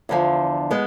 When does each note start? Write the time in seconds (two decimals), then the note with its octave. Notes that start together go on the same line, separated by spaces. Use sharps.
0.09 E2 D3 F3
0.70 G#3 B3